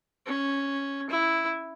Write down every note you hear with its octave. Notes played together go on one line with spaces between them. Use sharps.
C#4
E4